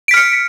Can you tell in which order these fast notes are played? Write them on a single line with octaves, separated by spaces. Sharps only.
D7 B6 F6 C#7